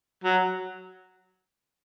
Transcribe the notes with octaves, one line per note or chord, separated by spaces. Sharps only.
F#3